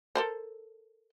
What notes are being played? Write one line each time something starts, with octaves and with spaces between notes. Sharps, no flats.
A4 A#4 C5